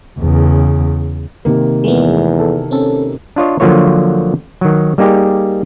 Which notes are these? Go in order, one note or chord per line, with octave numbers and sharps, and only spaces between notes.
E2 C#3
C3 D#3 A#3
E2 G#3 A3 B3
A4
C4 C#4 A4
D4 F4 C#5 D#5
D3 F3 F#3 A#3 F4 C#5
D#3 F#3
G3 A#3 D#4 G4 G#4